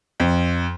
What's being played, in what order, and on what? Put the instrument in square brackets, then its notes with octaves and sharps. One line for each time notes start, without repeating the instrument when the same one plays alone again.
[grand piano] F2